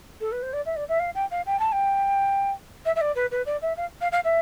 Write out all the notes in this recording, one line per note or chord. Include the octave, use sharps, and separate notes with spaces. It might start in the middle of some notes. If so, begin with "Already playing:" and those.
A4
B4
C5
D5
E5
D5
E5
F5
G5
F5
G5
A5
G5
E5
E5
D5
B4
B4
D5
E5
F5
F5
F5
E5